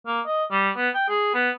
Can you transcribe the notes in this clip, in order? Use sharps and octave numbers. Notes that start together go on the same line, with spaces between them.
A#3
D#5
G3
B3
G5
G#4
B3